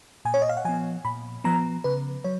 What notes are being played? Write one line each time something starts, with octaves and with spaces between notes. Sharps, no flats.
A#2 G#5
C#5
D#5
F5
F#5
F3 B3 G#5
A#2 B5
F3 B3 A#5
C#3 B4
F#3 C#5